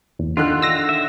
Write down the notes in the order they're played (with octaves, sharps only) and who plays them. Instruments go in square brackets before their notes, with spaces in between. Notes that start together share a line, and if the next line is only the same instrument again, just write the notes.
[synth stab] E2
[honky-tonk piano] D3 D#3 F#6 [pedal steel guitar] F4
[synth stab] E6 A#6
[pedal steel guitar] E5